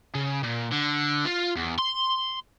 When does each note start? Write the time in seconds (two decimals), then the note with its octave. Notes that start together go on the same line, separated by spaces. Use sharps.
0.15 C#3
0.44 A#2
0.72 D3
1.25 F4
1.57 E2
1.79 C6